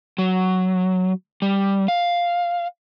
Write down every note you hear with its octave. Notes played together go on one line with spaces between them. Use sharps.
F#3
G3
F5